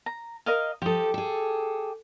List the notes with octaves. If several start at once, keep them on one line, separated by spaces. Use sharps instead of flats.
A#5
A#4 D#5 F5
F3 G4 A4 D#6
G#4 A4